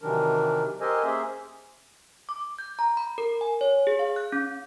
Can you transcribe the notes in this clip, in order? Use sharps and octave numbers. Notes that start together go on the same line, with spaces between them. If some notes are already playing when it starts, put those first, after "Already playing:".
C3 D#3 E3 F#3 D4 A#4
G4 A4 A#4 C5 D#5 G#5
A#3 C#4 G#4 C5 E5
D6
G6
A#5
B5
A#4
G#5
C#5
G#4
F5
F#6
C#4